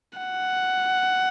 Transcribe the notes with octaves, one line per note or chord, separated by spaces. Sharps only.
F#5